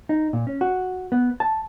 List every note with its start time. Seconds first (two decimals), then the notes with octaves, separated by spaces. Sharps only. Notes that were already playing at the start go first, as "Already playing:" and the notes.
0.09 D#4
0.33 A#2
0.47 C#4
0.61 F#4
1.12 B3
1.40 A5